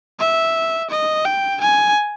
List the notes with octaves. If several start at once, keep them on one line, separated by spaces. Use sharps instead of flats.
E5
D#5
G5
G#5